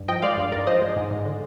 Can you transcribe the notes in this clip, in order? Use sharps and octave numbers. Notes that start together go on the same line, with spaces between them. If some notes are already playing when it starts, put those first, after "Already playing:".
Already playing: G2
F3 D#5 G5
G#3 D5 F5
G2
G2 A#4 D5
F3 C5 D#5
G#3
G#2
G#2
D3